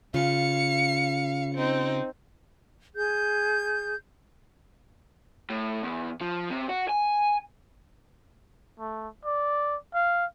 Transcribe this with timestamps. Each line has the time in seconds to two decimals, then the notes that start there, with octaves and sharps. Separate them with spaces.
0.14 C#3 F4 F5 C#7
1.54 C4 D#4
2.94 G#4 G6
5.50 A2
5.83 E2
6.21 F3
6.50 C3
6.69 F#4
6.89 G#5
8.80 A3
9.25 D5
9.95 F5